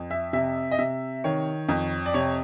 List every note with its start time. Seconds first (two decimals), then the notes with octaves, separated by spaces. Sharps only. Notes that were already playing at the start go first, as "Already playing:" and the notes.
Already playing: F2
0.11 E5
0.33 C3 E5
0.71 D#5
0.79 C3 E5
1.24 D#3 C#5
1.69 F2
2.06 D5
2.14 C3 C#5